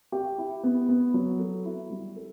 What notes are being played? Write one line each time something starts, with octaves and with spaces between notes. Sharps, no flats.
G4
E4
B3
B3
F#3
A4
E4
G3
A4